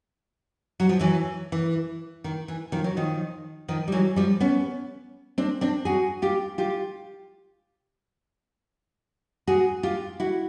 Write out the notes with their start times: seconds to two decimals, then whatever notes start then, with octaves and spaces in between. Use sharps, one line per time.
0.80 F#3
0.89 F3
1.00 E3 F#3
1.52 E3
2.24 D#3
2.48 E3
2.72 D#3 F3
2.84 F#3
2.97 D#3 F3
3.68 D#3 F3
3.88 G3
3.92 E3 F#3
4.16 F3 G3
4.40 B3 C#4
5.38 C4 D4
5.61 C4 D4
5.85 F#4 G#4
6.22 F4 G4
6.58 F4 G4
9.47 F#4 G#4
9.83 F4 G4
10.20 E4 F#4